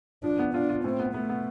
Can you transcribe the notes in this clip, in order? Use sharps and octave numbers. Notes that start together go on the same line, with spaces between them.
F3 D4
B3
D4 F4
F4
A2 C4
B3
A3 B3
B3